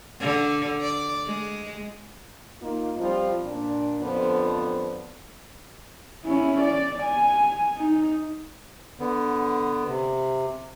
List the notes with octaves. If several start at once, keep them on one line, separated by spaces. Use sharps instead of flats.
D3
D5
G#3
A#3 D#4 F4
F3 G3 C4 F4
A#2 D4
F2 D3 F3 B3
C#4 E4
D5
G#5
D#4
D3 B3
C3